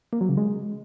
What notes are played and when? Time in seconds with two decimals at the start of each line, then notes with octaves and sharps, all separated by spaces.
0.13 A#3
0.21 F#3
0.29 C#3
0.37 G#3